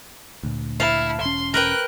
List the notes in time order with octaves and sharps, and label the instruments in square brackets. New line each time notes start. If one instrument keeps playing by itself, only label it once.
[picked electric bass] D2 A#2
[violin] E4 [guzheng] F5 A5
[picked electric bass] E1 C#4 [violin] C6
[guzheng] A#4 B4 G5 [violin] F#6